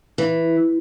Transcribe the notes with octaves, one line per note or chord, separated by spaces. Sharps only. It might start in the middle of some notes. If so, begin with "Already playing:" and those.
E3